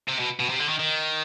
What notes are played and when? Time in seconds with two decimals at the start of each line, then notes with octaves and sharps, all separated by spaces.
0.09 C3
0.20 B2
0.40 B2
0.49 C3
0.59 D3
0.69 D#3
0.79 D#3